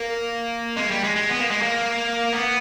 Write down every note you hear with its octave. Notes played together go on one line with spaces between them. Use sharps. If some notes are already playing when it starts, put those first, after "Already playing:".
Already playing: A#3
G#3
G3
G#3
G#3
B3
A#3
G#3
A#3
B3